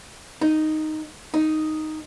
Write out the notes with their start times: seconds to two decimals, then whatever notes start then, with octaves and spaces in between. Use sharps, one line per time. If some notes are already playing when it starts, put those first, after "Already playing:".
0.41 D#4
1.34 D#4